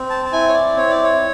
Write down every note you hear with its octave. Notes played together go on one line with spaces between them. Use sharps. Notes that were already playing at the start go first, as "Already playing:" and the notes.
Already playing: C4
A5
A5
E4 G#5
C#5
D5
C4 C#5
D5
C#5